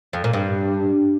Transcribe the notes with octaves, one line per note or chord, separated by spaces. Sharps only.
F2
A#2
G2